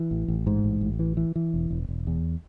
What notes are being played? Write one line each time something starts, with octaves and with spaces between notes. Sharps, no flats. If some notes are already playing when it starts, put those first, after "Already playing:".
Already playing: E3
A1
A1
G#2
A1
A1
E3
E3
E3
E1
E1
E1
E2